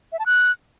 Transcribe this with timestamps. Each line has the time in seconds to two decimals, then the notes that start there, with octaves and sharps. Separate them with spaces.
0.12 E5
0.19 A5
0.26 F#6